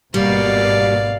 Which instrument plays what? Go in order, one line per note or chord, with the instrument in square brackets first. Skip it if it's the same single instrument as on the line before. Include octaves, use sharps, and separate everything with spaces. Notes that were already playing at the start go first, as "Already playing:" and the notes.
[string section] G#1 B2 A#3 [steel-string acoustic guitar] G3 [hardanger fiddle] D5 F5